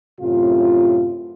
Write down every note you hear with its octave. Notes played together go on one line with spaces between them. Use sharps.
F#2 A2 C3 F4